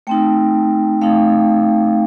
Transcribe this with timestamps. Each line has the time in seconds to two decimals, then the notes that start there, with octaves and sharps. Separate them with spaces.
0.07 A3 C4 D#4 G5
1.02 A3 C4 D#4 F5